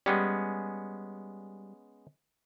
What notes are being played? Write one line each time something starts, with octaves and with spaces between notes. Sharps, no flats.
G3 G#3 B3 C#4